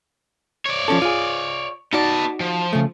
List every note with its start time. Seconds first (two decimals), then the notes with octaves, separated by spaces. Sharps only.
0.66 C#5 D5
0.88 F3 C#4 A4
1.02 F4 G#4
1.93 B3 D#4 F#4 D5 A5
2.40 F3
2.73 C#3 A3